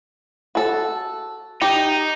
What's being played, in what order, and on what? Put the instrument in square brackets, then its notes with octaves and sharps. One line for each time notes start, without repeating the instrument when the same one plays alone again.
[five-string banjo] F#4 A4
[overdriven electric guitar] D#4 [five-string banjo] G4